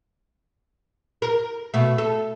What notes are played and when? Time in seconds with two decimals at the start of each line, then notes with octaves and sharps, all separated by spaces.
1.22 A#4
1.74 B2 A3
1.98 A4